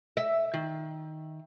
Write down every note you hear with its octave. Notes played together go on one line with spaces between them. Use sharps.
E5
D#3